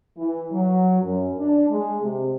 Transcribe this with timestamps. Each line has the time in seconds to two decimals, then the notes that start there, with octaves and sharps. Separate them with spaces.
0.17 E3
0.51 F#3
1.02 F#2
1.38 D4
1.70 G#3
2.02 C3